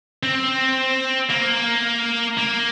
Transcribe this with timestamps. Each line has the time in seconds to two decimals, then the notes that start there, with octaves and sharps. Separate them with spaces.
0.23 C4
1.30 A#3
2.38 A#3